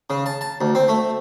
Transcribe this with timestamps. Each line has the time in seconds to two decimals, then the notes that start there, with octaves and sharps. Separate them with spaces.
0.10 C#3
0.26 A5
0.41 A5
0.61 D2
0.75 C4
0.88 A3